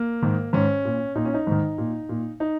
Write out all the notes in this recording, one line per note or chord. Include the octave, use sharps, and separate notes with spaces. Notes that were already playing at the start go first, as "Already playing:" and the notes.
Already playing: A#3
G#2 D#3
G#2 D#3 C#4
A#2
A#2 D#4
C#4
D#4
G#2 D#3
A#2
A#2
D#4